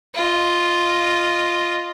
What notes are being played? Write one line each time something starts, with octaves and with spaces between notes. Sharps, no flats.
F4 D#5